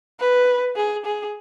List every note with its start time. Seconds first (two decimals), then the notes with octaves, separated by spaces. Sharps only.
0.20 B4
0.76 G#4
1.05 G#4